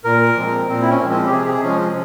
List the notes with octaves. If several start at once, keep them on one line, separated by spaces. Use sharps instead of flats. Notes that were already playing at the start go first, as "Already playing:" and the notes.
A#2 A#4
F3 G#3 C4
A#2 C4
E4
C#4
C4
F3 G#3
C4
G4
C3 G#4
G#4
F3 G#3 C#4